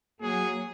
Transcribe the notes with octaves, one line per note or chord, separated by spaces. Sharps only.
F#3 A#3 G#4